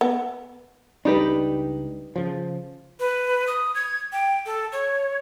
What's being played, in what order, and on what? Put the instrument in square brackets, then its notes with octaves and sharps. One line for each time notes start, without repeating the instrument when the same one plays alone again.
[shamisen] B3
[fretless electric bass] C#2 G3 D4 [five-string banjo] D#4 G4 B4
[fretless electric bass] C#3 F3
[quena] B4
D#6
G#6
G5
A4
C#5